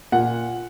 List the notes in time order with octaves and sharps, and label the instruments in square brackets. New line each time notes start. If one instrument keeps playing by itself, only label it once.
[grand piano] A#2 F#5